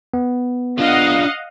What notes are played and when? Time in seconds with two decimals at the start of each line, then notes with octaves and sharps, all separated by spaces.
0.14 B3
0.79 D4 F4 D#5 F5 F#5